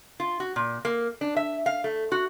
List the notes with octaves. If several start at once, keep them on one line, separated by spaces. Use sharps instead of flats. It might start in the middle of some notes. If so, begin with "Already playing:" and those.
F4
F#4
A#2
A#3
D4
E5
F5
A3
F#4